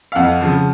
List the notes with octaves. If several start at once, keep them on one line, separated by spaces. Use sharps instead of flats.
F5
F2 F#5
C#3 F3